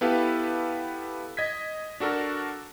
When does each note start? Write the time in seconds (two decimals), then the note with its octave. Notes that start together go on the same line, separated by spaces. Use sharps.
0.01 B3 E4 G4 A4 B4 F5
1.37 D#5 G#6 B6
2.00 D4 F#4 A4 A#4